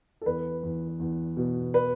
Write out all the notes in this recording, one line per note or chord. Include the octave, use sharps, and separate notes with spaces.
A4
E2 B4
E2
E2
B2
B4